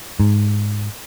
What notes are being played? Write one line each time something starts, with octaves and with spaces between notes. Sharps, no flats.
G#2